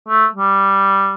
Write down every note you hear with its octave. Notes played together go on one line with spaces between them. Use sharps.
A3
G3